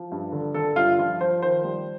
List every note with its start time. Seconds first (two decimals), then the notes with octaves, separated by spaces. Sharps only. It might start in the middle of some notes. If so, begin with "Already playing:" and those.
Already playing: F3
0.12 G2
0.32 D3
0.54 D3 A4
0.76 G2 F4
0.98 F3 F4
1.21 F3 C5
1.42 D#3 C5
1.64 G3